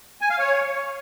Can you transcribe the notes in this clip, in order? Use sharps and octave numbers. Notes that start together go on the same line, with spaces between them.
G#5
F5
C#5